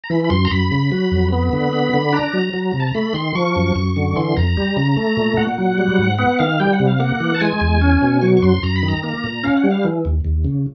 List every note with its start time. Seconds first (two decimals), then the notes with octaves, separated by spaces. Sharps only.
0.04 A#5
0.10 E3 B5
0.24 B5
0.30 F#2 C6
0.45 A#5
0.51 F#2 B5
0.71 C#3
0.92 F#3
1.12 F2
1.32 B3 B5
1.53 D3
1.73 B3
1.94 D3
2.13 D4 A#5
2.33 F#3
2.54 F#3
2.74 C3
2.80 A5
2.87 A#5
2.95 A3 B5
3.14 D#3 C6
3.35 F3 C#6
3.56 F#2
3.76 F#2
3.96 D3
4.16 E3 C6
4.37 F2 A#5
4.57 G3
4.77 C#3
4.97 A3
5.17 A#2
5.37 A#2 F#5
5.58 F#3
5.78 G3
5.99 G#2
6.18 B3 F#5
6.39 D#3 F5
6.60 G3 G5
6.73 F#5
6.80 C3
6.87 F5
7.00 A#3 F#5
7.20 E3
7.35 A5
7.40 G#3 G#5
7.61 E2
7.81 C#4
8.02 B2
8.21 F#3 C#6
8.37 C#6
8.42 F#2 C6
8.63 F#2 A#5
8.76 B5
8.83 D#3
8.88 A#5
9.03 A#3
9.24 A#2
9.44 C#4 F5
9.57 F#5
9.64 G3
9.71 F5
9.85 E3
10.05 D#2
10.25 D#2
10.45 C#3